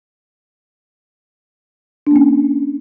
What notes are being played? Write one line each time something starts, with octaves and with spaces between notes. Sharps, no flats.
A#3 C#4 D4